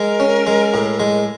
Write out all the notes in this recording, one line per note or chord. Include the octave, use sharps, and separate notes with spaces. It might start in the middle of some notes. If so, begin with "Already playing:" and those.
Already playing: G#3 A#4
C#4
G#3
A2
G#3